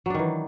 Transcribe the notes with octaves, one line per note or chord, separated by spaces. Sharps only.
D#3 E3 F#3 D4